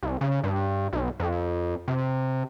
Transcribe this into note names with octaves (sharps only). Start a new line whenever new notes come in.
C2
C#3
G2
B1
F2
C3